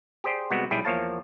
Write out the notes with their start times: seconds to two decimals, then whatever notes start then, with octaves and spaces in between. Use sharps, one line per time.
0.24 G4 G#4 C5 D5 G5
0.51 C3 G3 G#3 B3 F#4
0.71 B1 G3 E4 G#4 G5
0.85 E2 F3 A#3 C#5 F5 A5